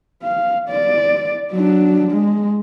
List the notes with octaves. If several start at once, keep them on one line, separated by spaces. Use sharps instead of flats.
F5
D5
F#3 D4
G#3